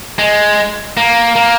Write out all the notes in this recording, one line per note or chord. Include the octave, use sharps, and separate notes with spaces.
G#3
A#3
A#3